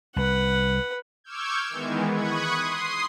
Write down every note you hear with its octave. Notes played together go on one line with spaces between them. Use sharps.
C2 B4 F#5
C#6 D6 E6 F6 G6 G#6
D#3 E3 G#3 B3
B5 C#6 D#6 F#6 G#6
C6 D#6 C7